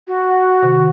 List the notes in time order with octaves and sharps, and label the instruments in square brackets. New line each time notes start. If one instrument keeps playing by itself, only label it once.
[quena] F#4
[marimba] C3 D#3